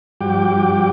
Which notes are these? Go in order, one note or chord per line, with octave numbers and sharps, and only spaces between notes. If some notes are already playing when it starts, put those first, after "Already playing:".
G2 F3 G3 F#4 G5 D6